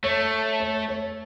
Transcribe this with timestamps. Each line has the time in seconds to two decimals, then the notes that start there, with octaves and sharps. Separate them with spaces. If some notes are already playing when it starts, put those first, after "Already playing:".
0.04 A3 C#5
0.60 C#5
0.89 C#5